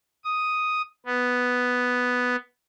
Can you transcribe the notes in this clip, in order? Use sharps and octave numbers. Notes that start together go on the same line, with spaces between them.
D#6
B3